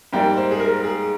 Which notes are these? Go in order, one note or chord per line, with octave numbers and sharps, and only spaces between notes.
G#2 G3 A#3 G5
C5
G#4
A#4
G#4